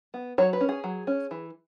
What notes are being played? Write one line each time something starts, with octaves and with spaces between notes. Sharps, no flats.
B3
F#3 C#5
B4
C#4
G#4
F#3
C#4
E3